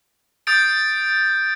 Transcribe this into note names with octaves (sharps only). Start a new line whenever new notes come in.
D#6 G6 A6 D7